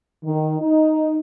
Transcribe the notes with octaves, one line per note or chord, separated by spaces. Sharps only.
D#3
D#4